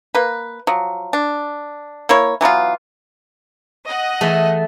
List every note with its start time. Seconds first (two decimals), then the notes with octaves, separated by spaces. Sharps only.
0.15 A#3 B4
0.67 F3 F#3
1.13 D4
2.09 A#3 E4 C#5
2.41 E3 F#3 B3 F4
3.87 D#5 F#5
4.21 E3 A3 G#4 A5